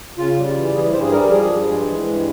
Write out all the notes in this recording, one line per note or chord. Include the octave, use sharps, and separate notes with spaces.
C#3 F4
G3
E3
E3 G#4
G2 C5
G#4
G3 A#4
F3 G#4
G2
G#3
E3
G2